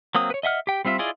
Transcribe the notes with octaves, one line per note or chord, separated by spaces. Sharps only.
F#3 A#3 C4 D#6
B4 C#5
D#5 E5 F#5 F6
G4 G5
G3 C4 F4 E5
E4 F4 G#4 D5 D#5